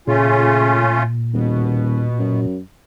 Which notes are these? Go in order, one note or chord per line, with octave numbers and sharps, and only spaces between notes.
A#2 C#3 A3 C#4 F4
D#1 B2
F#2